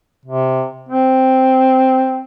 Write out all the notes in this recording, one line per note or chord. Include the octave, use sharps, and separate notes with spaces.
C3
C4